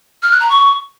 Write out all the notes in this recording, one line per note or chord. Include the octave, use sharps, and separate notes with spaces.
F6
F#6
A#5
C#6